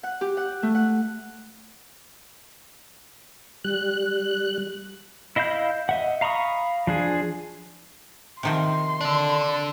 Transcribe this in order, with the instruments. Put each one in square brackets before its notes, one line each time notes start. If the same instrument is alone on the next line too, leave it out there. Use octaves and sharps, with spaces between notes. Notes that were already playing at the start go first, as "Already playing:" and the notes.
[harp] F#5
G4
F#5
A3
F#5
[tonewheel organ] G3 F#6
[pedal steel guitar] E4 D#5 F5 B5 G6
D#5 E5 F#5
F5 A#5 B5 C#6 D#6
F3 D4 G#4
[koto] C3 D#3 F3 [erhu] C6
[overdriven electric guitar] D4 A4